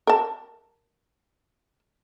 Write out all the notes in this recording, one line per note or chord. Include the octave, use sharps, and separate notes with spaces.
A#4 A5